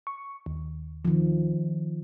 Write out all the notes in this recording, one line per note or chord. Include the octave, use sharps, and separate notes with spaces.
C#6
D#2
D#3 F3